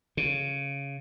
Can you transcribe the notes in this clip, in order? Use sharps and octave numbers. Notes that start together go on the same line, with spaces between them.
C#3